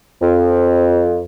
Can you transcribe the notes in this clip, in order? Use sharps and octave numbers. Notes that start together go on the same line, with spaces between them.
F2